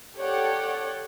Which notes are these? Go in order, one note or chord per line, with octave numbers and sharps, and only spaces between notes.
G4 A4 C#5 D5 F#5 G5